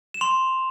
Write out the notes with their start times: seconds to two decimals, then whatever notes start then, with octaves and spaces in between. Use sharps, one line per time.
0.14 E7
0.21 C6 F7